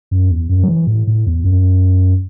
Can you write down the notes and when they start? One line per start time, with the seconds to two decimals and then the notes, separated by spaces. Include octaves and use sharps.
0.11 F#2
0.30 E2
0.49 F#2
0.63 F#3
0.68 E3
0.87 A2
1.07 A2
1.26 E2
1.44 F#2